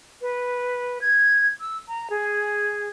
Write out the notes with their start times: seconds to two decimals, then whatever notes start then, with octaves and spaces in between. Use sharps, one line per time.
0.22 B4
1.01 G#6
1.60 E6
1.88 A#5
2.10 G#4